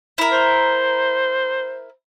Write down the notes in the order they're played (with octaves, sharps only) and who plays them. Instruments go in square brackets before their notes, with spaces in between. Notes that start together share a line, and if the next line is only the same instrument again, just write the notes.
[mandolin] E4 A#4
[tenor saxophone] C5